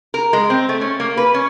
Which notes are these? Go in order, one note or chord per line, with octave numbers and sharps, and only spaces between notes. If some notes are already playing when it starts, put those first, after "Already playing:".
A#4
G#3
C4
A3
C#4
A#3
B4
C#4